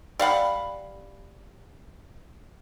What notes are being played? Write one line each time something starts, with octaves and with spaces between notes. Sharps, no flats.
G3 F5 F#5 B5